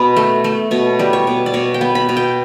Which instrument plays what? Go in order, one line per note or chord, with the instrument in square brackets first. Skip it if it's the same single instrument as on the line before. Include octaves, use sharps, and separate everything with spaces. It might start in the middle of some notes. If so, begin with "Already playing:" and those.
Already playing: [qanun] B2 B4
A3
A3
B2 C#5
G3
C#5
B2
D5
B2 C#5
G5
B3
B5
B2
G5